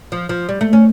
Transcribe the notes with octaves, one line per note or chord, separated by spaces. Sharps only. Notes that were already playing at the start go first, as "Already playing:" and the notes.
F3
F3
G3
A3
C#4